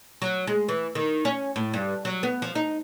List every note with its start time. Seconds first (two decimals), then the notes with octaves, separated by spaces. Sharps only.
0.22 F#3
0.47 G#3
0.68 E3
0.95 D#3
1.25 C#4
1.56 A2
1.74 G2
2.05 F#3
2.23 B3
2.42 F3
2.55 D#4